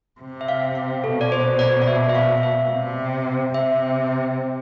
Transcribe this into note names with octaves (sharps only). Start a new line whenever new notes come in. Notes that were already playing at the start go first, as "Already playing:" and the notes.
C3
E5
F5
F5
B2 A4
D5
C5
D5
D5
E5
E5
F5
F5
E5
C3
C3 E5